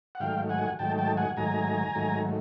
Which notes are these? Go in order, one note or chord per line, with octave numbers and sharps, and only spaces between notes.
F#5
G#2 D#3 F#3 A3 F5 G5
F#5 G#5
G#2 D#3 F#3 A3 G5 A5
G5 A5
F#5 G#5
G#2 D#3 F#3 A3 G#5 A#5
G#2 D#3 F#3 A3